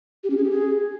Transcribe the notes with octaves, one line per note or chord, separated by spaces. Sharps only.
G4
C#4
G#4
G4
G#4